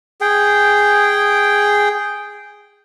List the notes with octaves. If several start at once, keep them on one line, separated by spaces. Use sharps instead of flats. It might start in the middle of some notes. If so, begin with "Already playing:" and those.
G#4 G5